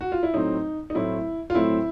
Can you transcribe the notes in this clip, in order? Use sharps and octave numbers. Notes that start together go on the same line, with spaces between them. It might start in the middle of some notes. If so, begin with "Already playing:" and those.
F#4
F4
E4
A2 F#3 A3 C4 D#4
D#4
A2 F#3 A3 C4 E4
F4
A2 F#3 A3 C4 E4